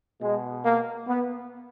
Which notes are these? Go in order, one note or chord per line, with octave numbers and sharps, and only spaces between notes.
B2 G#3
A#3
B3